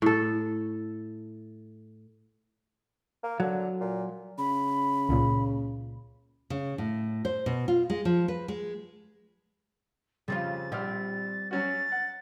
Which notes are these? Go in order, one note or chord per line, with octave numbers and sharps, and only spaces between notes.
A2 A4
A#3
D3 F#3
A#2
C#3 B5
C#2 A#2
C#3
A2
C5
B2
F4
G#3
F3
B4
G#3
F2 C#3 G3 C4 F4 A6
A#1 G3 C4 G4 F6
F#3 C#4 F#4 A6
F#5